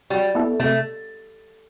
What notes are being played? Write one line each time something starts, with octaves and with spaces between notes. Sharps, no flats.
F#3 G3
B3 E4 A4
C3 A3